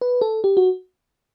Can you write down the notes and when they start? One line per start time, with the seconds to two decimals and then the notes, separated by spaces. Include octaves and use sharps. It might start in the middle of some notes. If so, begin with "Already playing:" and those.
0.01 B4
0.21 A4
0.44 G4
0.57 F#4